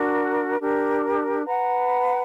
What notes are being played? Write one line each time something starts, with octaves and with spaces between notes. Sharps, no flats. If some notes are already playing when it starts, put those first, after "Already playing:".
Already playing: D4 F#4 A#4
D4 G4 A#4
B4 F#5 A#5